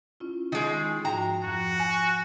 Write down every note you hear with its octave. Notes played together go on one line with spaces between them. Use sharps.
C#4 E4 F4
D#3 G#3
G#2 F3 F#4 G5 A#5
F2 F3 F#4
G#5